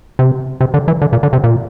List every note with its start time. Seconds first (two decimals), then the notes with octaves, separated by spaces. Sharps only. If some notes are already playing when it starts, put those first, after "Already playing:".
0.19 C3
0.61 C3
0.74 D3
0.88 E3
1.02 D3
1.13 A#2
1.23 D3
1.33 C3
1.44 A#2